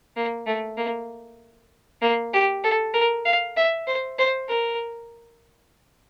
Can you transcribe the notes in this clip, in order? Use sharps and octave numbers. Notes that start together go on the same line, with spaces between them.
A#3
A3
A#3
A#3
G4
A4
A#4
F5
E5
C5
C5
A#4